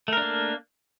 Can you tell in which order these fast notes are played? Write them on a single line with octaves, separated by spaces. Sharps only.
A3 A#4 D4 A#3